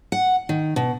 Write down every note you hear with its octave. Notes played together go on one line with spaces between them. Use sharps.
F#5
D#3
B2